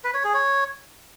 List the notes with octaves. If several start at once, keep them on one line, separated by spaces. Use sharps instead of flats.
B4
C#5
G#4
C#5